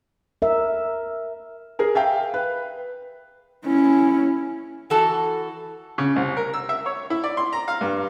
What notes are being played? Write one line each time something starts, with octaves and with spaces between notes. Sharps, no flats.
A#4 E5
G#4 A#4 A#5
E5 F5 G5
B4
C#4 E4
E3 F#4 A4
C#3
C2
A#4
E6
E5
C#5
E4
D5
C6
A#5
F5
G2